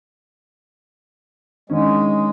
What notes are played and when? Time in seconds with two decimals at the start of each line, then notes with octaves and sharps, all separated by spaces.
1.70 D3 D#3 G#3 C#4